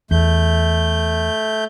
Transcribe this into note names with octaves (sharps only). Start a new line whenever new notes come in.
E2 A3 G6